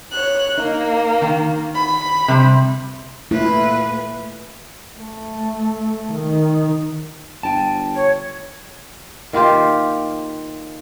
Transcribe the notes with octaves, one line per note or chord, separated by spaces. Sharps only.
C#5 F#6
A#3 D#4
D#3
B5
C3 G3
A#2 A3 E4 B4
A3
D#3
G1 G5 A5
C#5
D#3 A#3 F4 G4